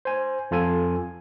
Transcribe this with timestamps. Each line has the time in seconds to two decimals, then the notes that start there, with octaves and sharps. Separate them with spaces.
0.05 C5 G#5
0.51 F2 F4 A4 G#5